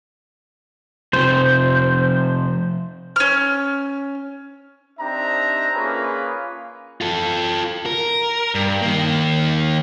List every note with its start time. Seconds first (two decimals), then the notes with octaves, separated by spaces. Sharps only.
1.13 C3 F3 C5
3.16 C#4 F6
4.99 C4 D4 D#4 G4 E5 A#5
5.75 A#3 C#4 F4 G#4 A#4 B4
7.01 F4 A4
7.86 A#4
8.55 G2
8.82 D#3 A#3